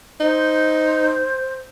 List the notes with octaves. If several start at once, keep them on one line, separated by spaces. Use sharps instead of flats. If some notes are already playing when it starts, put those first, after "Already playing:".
D#4 C5